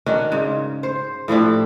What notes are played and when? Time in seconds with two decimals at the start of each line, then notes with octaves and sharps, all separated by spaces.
0.06 D#3 C#4 D4 F#4
0.32 G#2 C#3
0.83 C5
1.28 A2 F3 D4 G4